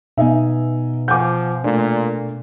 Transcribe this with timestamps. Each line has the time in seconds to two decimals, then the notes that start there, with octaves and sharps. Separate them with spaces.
0.18 B2 B3 D#4 E5 F5 G#5
1.08 F3 F#5 G#5 D6 G6
1.64 A#2 A3 D4